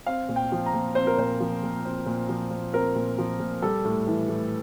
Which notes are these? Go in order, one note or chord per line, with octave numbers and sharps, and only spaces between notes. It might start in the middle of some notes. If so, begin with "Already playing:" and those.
C4 F5
A#2
G5
F3
A#5
A#2
C4 C5
A#4
A#2 C5
F3
A#2
C4
A#2
F3
A#2
C4 A#4
A#2
F3
A#2
G3 A4
A2
E3
A2